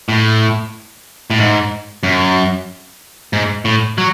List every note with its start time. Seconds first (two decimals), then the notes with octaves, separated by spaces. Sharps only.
0.09 A2
1.30 A2
1.38 G#2
2.03 F#2
3.33 G#2
3.65 A2
3.98 F#3